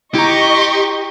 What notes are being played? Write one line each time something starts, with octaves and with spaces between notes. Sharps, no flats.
E4 G4 D#5 A#5 C#6